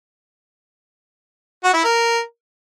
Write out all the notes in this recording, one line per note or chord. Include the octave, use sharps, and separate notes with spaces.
F#4
E4
A#4